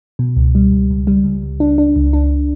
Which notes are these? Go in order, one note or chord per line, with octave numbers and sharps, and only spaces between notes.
B2
C#2
G3
C#2
C#2
G3
C#2
C#2
D4
D4
C#2
D4